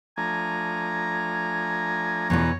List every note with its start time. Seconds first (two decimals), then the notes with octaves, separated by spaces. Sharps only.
0.18 F3 A3 D4 G#5 A#5
2.30 E2 B2 E3 C#5